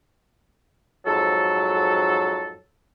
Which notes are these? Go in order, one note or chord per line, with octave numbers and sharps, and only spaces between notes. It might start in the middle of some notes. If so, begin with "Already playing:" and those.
F2 G#2 F#3 A4